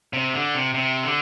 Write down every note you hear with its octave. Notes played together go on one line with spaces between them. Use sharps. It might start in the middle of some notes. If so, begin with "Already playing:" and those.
C3
D3
C3
C3
D3